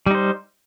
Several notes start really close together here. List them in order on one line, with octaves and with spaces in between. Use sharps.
G3 D#4 C5